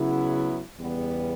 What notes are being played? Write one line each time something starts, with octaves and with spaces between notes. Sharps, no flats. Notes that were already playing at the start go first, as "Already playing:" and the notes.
Already playing: C#3 F#3 B3 E4
E2 C#3 G3 B3